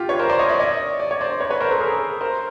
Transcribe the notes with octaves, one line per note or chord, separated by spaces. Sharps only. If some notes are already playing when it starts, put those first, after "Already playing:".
Already playing: F4 G4
B4 C#5
A#4 C5
C5 D5
C#5 D#5
D5 E5
C#5 D#5
D5
C#5
C5 D5
B4 C#5
B4 C#5
A#4 C5
A4 B4
G#4 A#4
A#4 C5